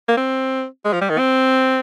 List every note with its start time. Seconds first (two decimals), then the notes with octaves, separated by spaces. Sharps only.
0.08 A#3
0.17 C4
0.85 G#3
0.93 F3
1.01 G3
1.10 D#3
1.18 C4